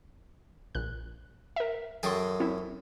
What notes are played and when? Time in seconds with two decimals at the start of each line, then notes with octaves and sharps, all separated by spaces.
0.75 A#1 F#6
1.56 A#4 E5
2.03 F#2 G#4 A4 G5 C6
2.40 C4 C#4 E4